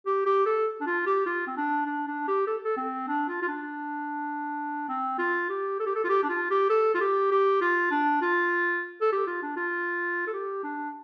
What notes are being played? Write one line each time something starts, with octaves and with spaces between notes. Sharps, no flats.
G4
G4
A4
D4
F4
G4
F4
C4
D4
D4
D4
G4
A4
A4
C4
D4
F4
F4
D4
C4
F4
G4
A4
G4
A4
F4
G4
D4
F4
G4
A4
F4
G4
G4
F4
D4
F4
A4
G4
F4
D4
F4
A4
G4
D4